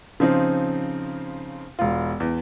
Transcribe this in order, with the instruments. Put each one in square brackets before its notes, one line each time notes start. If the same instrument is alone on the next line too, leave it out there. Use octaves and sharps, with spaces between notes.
[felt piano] C#3 F3 C4 D#4
E1 F4
E2